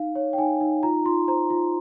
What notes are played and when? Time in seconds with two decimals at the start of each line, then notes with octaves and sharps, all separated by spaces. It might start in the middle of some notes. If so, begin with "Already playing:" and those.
Already playing: D#4 F5
0.15 C#5
0.33 G5
0.38 D#4 G#5
0.61 D#4
0.83 F4 A#5
1.05 F4 C6
1.28 C5 A#5
1.50 F4